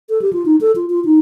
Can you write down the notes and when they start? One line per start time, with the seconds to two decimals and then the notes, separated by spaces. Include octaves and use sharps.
0.09 A4
0.22 G4
0.33 F4
0.46 D#4
0.61 A4
0.76 F4
0.90 F4
1.05 D#4